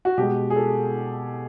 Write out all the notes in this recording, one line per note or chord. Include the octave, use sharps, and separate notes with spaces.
F#4
B2 G#3 G4
G#4
A4